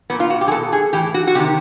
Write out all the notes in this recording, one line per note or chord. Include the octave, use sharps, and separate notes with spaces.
A#2 B3
F4
F#4
G4
G#4
B2 A4
G#4
A2 E3 G4
F#4
F#4
C3 D#3 G4